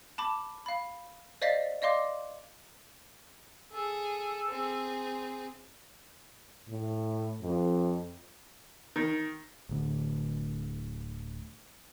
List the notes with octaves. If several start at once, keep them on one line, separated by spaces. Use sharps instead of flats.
A5 B5 D6
F5 B5
C5 D5 D#5 F5 A6 B6
D5 D#5 F5 C6 D6
G#4 A4
C4 G#4
A2
F2
D#3
D1 D2